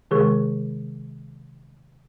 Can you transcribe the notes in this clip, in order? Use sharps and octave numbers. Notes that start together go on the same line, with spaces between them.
C3 D#3 G#3 G#4 A#4 C#6